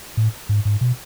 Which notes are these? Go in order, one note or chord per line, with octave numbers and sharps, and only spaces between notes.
A2
G#2
G#2
B2